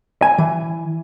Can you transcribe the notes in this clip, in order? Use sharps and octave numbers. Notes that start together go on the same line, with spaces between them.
G#5
E3